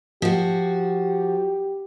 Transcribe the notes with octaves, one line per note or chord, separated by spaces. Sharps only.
F3 F#4 G4